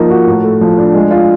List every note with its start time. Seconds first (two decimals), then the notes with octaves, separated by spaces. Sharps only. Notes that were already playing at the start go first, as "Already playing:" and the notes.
Already playing: F3 A#3 D#4
0.10 F#4
0.27 A2
0.44 A3
0.61 F3
0.78 D4
0.95 G#3
1.11 F4